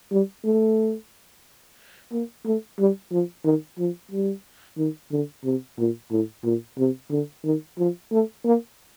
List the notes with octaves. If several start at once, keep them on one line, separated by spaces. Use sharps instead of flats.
G3
A3
A#3
A3
G3
F3
D#3
F3
G3
D#3
D3
C3
A#2
A2
A#2
C3
D3
D#3
F3
A3
A#3